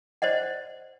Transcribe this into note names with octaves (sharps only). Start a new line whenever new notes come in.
C5 D5 D#5 F#5